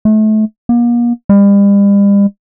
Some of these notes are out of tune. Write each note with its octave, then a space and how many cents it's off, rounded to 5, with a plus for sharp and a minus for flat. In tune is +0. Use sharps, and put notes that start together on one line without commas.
A3 -30
A#3 +40
G3 +40